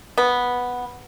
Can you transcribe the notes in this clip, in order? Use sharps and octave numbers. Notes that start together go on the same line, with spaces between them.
B3